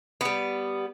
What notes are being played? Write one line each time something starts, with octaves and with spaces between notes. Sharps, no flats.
G3 B3